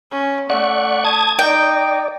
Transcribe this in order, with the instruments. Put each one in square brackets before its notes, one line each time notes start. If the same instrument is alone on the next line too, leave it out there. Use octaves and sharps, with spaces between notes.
[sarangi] C#4
[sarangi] A3 [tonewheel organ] D5 F#5 C#6
[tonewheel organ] A5 D#6 G#6
[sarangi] D#4 [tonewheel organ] D5 [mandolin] G5